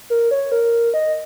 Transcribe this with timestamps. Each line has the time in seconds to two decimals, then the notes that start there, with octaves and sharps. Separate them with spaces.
0.10 A#4
0.31 C#5
0.52 A#4
0.94 D#5